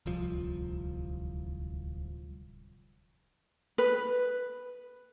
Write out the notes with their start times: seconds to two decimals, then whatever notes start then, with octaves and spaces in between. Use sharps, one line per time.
0.06 D1 C2 F3
3.78 B4